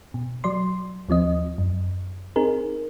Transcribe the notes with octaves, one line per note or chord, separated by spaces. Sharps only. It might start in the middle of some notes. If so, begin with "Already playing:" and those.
B2
F#3 D5 C6
D#2 F3 C4 D#5
F#2
C4 D#4 G#4 A#4